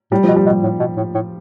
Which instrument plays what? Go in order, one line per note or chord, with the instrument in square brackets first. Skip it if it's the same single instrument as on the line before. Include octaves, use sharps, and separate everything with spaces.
[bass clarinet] A2 [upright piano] G3
[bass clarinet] B2 [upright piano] F3
[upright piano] G3
[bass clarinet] B2
[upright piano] G3
[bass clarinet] A2
B2
A2
A2